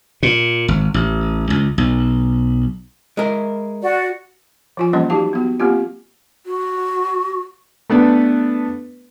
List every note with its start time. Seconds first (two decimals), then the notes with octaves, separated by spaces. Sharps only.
0.23 A#2
0.68 G#1
0.94 A1
1.50 C#2
1.78 B1
3.17 G#3 E4 A#4
3.82 F#4 D5
4.77 F3 F4 G#5
4.93 E3 G3 A#3 C#4 D#5 C6
5.10 F#3 D#4 F#4 G4 F5 A5
5.33 B3 F#4
5.60 A3 A#3 C4 F4 G4
6.45 F#4
7.90 A3 B3 D4 B4